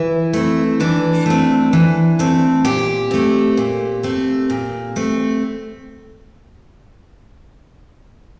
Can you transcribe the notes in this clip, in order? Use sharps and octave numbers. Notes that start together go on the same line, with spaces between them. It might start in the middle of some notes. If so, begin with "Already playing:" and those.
Already playing: E3 E4
A3 C4
E3 D4
A3 C4
E3
A3 C4
A#2 G4
A3 C4
A#2
A3 C4
A#2
A3 C4